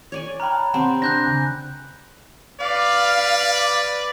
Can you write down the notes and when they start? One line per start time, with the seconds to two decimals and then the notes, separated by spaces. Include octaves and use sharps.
0.12 C#5 D5 G#5
0.40 G5 A#5 B5 F6 F#6
0.54 A5
0.74 C3 C4 C5 F#5 A5 C6
1.02 D4 F#6 G6 A#6
1.26 C#3 G#5
2.61 B4 D5 F5